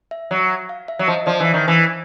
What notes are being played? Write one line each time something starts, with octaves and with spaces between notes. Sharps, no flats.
E5
F#3
F5
E5
F#3
F3 D#5
F3 D5
E3
E5
D#3
E3